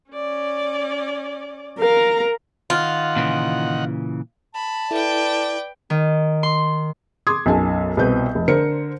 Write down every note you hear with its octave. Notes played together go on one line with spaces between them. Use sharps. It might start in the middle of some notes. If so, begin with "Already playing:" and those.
C#4 D5
A#4 F5 A#5
D#3 F4 F#5
A#2 C#3 E3
A5 B5
E4 A4 B4 D5 G5
D#3
C6
C6 D6 D#6 G#6
B1 F#2 G#5 A5
C2 B2 C4 B4 G6
F1
D3 A#4 C5 C#7